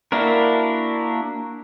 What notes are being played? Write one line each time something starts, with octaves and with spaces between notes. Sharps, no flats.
A#3 D4 E4 F#4 A#4